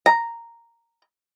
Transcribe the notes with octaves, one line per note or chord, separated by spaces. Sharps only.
A#5